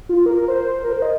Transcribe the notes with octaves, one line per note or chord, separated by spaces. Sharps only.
F4
A#4
A#4
C5
A#4
C5
D#5